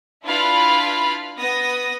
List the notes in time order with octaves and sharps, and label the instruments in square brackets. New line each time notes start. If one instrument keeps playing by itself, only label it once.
[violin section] D4 E4 F4 B4 F5 B5
B3 D#6 A#6